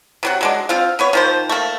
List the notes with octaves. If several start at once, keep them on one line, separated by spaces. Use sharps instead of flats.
C3 F#3 F#5
F#3 G#3 D4
C4 F4 F5
B3 B4 C#5
D#3 F3 C5
A3 A#3